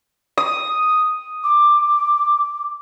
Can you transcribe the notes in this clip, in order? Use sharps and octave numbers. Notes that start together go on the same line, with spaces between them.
D#6
D6